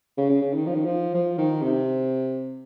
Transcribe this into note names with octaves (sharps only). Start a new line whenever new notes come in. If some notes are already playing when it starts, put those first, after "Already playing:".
C#3
C#3
C#3
D#3
F3
D#3
F3
F3
D#3
C3